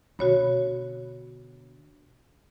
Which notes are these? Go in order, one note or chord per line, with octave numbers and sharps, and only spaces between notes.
B2 D3 F#4 C#5 B5